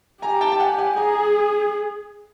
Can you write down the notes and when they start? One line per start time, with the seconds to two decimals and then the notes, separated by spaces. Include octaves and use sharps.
0.22 G4 G#5 A#5
0.41 G5 A5
0.52 A5
0.60 F#5 G#5
0.78 F#5 G#5
0.97 G#4 G#5 A#5